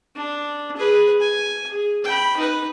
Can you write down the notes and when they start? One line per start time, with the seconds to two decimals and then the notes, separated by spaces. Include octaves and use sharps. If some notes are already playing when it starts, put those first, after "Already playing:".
0.16 D4
0.77 G#4 B4
1.21 G#5
1.69 G#4
2.04 G5 B5
2.37 D#4 B4